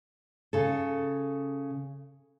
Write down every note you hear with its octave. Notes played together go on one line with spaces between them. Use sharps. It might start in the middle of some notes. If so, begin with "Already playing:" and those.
C#3 A4